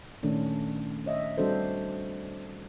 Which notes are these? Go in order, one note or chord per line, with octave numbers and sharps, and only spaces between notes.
A#2 D#3 A3 C#4 D4
C#5 D#5 E5
G3 C4 D4 F#4 A4 C5